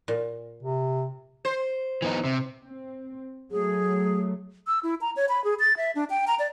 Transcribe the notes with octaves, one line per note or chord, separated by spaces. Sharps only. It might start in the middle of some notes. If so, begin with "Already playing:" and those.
A#2
C3
C5
E3 B3 D#4
C3
C4
F#3 A3 G#4
E6
E4
A#5
C#5
B5
G#4
A6
E5
D4
G5
A#5
D5